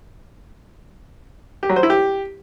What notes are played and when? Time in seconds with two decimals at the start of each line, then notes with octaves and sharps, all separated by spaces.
1.63 G4
1.69 F#3
1.76 C5
1.83 E4
1.90 G4